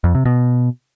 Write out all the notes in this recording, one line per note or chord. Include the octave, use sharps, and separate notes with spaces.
F2
C3
B2